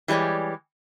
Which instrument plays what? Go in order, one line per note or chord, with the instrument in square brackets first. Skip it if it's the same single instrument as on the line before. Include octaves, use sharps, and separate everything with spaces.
[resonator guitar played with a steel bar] E3 G3 G#3 C#5 D5